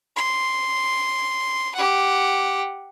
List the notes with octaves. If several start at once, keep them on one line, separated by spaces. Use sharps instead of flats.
C6
G4 F#5